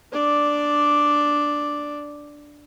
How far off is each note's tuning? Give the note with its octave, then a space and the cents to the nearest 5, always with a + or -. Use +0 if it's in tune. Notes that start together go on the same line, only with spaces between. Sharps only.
D4 +0 D5 +0